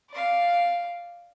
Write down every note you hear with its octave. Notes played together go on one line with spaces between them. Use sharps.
D5 F5